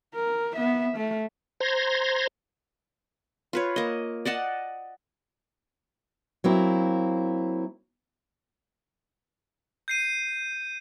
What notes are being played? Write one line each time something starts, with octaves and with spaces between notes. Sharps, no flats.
A#4
B3 E5
A3
C5 A#5 C6 G#6 A#6
F4 B4 C#5
A#3 D#5
D5 D#5 F#5 A5
F#3 A#3 C4 E4
G6 C7 D#7